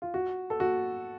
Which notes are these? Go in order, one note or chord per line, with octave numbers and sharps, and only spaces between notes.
F4
F#4
A4
F#4